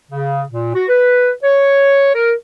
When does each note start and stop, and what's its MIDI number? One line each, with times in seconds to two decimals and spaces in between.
0.11 0.43 49
0.50 0.73 46
0.75 0.85 66
0.89 1.31 71
1.43 2.11 73
2.15 2.32 70